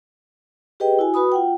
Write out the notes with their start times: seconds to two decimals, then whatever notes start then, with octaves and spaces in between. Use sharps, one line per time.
0.80 G4 G#4 B4 D#5 G5
0.99 E4 F#4 G#5
1.14 F#4 B4 B5 D#6
1.32 F4 F#5 G5